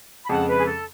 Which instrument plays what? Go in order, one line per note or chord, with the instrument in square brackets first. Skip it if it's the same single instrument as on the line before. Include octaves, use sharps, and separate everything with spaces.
[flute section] B5
[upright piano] F2 C#3 G#3 [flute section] F#5 A5
[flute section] B4
G#4
A4